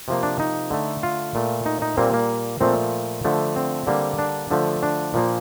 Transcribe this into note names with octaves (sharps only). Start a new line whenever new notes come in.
C3 F3 A#3
D4
D#4
D3 A3
F4
A#2 A3
D#4
D#4
A#2 G3 A#3 C4
A#3
A#2 F3 A3 C4
D3 F3 A3
C4
D3 G3 A#3
D4
D3 F3 A3
D4
A#2 F3 A#3